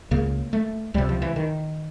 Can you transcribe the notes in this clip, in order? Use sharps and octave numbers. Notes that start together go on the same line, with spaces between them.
C#2 C#3 A#3
A3
C#2 C3 G3
F3
E3
D#3